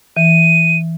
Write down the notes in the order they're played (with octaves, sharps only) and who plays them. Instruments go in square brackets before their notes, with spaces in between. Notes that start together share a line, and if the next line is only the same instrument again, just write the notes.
[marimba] E3 [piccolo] D#7